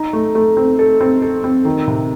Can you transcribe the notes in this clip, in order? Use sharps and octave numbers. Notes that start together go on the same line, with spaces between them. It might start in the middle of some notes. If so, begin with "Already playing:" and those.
Already playing: D#4
A3
A3
C4
A4
C4
A4
C4
D#3
C3